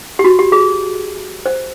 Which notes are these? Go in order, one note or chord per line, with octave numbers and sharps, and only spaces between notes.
G4
F#4
G4
G#4
C5